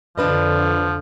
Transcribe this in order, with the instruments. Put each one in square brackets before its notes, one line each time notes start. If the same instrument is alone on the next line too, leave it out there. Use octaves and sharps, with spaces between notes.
[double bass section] F2 D3 [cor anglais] F3 [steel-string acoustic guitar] D4 B4 D#5